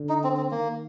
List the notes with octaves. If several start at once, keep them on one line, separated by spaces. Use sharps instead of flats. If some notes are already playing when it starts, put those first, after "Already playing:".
Already playing: D3
D#4
C4
C4
D#3 A#3